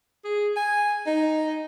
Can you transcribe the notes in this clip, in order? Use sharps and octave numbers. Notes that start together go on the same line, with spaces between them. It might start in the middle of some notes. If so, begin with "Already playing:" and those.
G#4
G#5
D#4